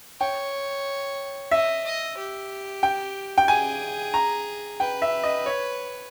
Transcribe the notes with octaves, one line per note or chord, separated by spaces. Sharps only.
C#5 G5
D#5 E5
D#5
G4
G5
G5
G#4 G#5
A#5
B4 G5
E5
D#5
C#5